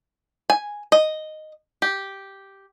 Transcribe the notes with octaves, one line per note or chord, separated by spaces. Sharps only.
G#5
D#5
G4